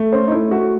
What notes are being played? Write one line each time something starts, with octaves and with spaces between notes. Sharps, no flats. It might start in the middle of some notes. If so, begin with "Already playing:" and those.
Already playing: A3
C#4 C5
D#4
A3 E4
A3 F#4